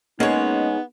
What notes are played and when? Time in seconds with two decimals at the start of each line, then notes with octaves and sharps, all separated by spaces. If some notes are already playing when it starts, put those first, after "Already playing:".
0.20 G#3 A#3 B3 C#4 D#4 C#5